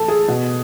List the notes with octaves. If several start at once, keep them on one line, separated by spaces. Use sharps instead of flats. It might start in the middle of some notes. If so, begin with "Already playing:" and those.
Already playing: A2 E3 A4 A5
G#4
B2